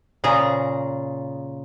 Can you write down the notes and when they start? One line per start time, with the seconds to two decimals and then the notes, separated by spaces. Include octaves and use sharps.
0.24 A#2 C#3 G#4 A#5